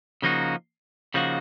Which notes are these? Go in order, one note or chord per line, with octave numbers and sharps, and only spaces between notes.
C#3 F3 A#3 D#4 F#4
C#3 F3 A#3 D#4 F#4